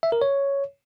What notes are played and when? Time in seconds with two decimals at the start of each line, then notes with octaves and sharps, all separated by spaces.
0.03 E5
0.12 A#4
0.22 C#5